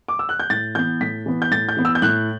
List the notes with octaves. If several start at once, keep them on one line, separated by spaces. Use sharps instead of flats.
D6
E6
F#6
G6
A2 A6
E3 B3 G6
A2 B6
E3 B3
G6
A2 A6
G6
E3 B3
E6
G6
A2 F#6